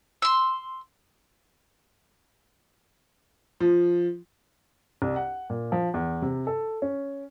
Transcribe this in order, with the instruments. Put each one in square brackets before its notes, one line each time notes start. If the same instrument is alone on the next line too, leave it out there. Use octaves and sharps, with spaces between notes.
[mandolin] C6 E6
[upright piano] F3
C2
F#5
A#2
F3
E2
C3
A4
C#4